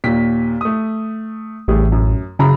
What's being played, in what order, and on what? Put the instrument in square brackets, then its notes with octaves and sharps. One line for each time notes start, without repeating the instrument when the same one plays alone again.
[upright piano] D#2 A#2 B6
A3 D#6
[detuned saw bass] A1 [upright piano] G3 A3 G#4
[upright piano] F#2
[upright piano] F#2 A#5 B5 [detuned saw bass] C#3